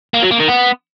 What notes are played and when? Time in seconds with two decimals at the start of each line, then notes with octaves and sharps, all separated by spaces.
0.14 A#3
0.23 F#3
0.31 A#3
0.40 D#3
0.49 B3